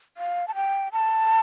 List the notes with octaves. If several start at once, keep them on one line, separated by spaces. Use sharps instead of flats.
F5
A5
G5
A5